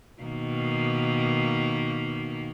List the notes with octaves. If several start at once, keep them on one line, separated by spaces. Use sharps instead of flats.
B2 D#3 A#3